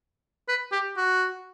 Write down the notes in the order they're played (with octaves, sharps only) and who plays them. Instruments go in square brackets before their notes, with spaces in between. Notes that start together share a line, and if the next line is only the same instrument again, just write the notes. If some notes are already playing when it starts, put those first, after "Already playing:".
[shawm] B4
G4
F#4